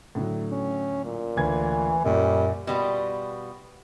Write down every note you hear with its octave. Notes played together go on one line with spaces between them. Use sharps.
A2 D3 F#3
C#4
A#2
D2 E3 G#6
F#2 A#2 G3
B2 G3 B3 F4